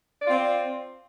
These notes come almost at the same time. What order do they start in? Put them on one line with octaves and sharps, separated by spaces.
D5 F4 C4